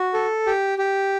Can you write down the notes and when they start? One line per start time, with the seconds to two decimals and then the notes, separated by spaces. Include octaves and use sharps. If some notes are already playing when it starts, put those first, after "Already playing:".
Already playing: F#4
0.14 A4
0.46 G4
0.78 G4